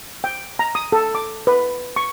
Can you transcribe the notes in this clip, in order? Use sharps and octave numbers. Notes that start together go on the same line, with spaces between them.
G5
A#5
D#6
A4
D6
B4
C#6